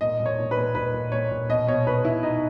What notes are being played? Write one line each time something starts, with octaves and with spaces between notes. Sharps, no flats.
A#2 D#5
A#2
C#5
A#2
B4
A#2
A#2 B4
A#2
A#2 C#5
A#2
B2 D#5
B2 C#5
B2 B4
B2 E4
B2 D#4